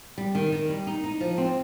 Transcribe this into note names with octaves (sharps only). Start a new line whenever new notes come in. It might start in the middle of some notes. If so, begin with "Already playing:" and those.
G3
D#3
D#3
G3
D#4
D#4
F3
C4